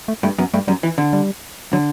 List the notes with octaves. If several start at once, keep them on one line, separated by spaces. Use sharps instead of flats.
A3
G2 A3
F#2 B3
G2 A3
F#2 G3
E3
D3
G3
D3 F#3